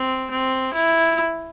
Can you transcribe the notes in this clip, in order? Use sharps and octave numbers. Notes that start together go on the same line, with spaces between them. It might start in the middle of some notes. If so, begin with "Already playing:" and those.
Already playing: C4
C4
E4